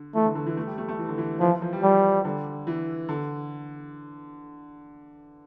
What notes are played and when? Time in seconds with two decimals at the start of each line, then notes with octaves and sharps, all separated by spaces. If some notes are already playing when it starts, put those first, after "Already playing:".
Already playing: D3
0.15 E3 A3
0.25 D3
0.35 D3
0.46 E3
0.57 A3
0.67 G3
0.78 A3
0.88 A3
0.99 E3
1.09 D3
1.18 E3
1.40 E3 F3
1.51 E3
1.62 F3
1.73 G3
1.83 F3 G3
2.25 D3
2.67 E3
3.09 D3